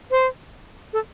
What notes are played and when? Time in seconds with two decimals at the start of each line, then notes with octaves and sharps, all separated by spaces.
0.11 C5
0.93 A4